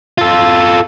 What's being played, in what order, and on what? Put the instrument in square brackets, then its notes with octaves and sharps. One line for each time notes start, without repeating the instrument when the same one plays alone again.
[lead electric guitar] F4 A4